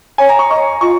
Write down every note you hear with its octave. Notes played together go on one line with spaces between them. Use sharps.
C#5 G#5
A#5
C#6
D#5 C#6
F4 C#6